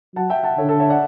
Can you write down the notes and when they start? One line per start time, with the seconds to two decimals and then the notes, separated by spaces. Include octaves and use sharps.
0.15 F#3 F#5 A5
0.30 E5 G5
0.43 F#5 A5
0.58 D3 A4 C#5
0.69 A4
0.80 C#5 E5
0.89 D5 F#5